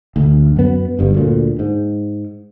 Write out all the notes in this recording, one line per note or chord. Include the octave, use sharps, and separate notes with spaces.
D2
F#2 B3
G1 G2
D2 A#2
G#2